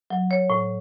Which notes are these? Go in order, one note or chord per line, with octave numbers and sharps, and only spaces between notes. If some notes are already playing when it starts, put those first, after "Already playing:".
F#3
F#3 C#5
A2